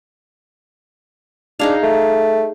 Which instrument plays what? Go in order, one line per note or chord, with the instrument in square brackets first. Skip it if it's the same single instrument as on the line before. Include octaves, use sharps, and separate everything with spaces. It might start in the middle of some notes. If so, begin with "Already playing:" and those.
[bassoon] D4 [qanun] D#4 G#4 F5
[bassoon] A3